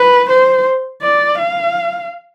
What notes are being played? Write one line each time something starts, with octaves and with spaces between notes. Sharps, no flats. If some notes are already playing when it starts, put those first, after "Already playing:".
Already playing: B4
C5
D5
F5